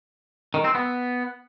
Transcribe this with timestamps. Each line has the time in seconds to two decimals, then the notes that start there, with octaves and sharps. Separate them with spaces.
0.54 D#3
0.64 C4
0.75 B3